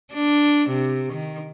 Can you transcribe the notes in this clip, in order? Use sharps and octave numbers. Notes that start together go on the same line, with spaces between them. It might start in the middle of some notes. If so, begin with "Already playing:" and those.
D4
C3
D#3